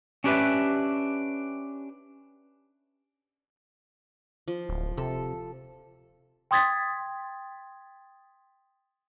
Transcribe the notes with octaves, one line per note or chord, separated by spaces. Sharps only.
C#4 D4 G4 A4 B4 E5
F3
D1
C3 A4
G5 C6 D#6 G#6 A6 B6